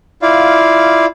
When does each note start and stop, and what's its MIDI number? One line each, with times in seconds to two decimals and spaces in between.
0.22 1.06 64
0.22 1.06 65
0.22 1.06 74
0.22 1.06 77